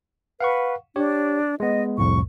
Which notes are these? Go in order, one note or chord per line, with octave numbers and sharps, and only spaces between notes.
B4 F5 F#5 C#6
D4 G4 C#5
G#3 B3 D#5
C2 F2 A2 C#6